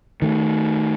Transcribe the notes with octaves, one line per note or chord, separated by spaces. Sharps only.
D#3 A3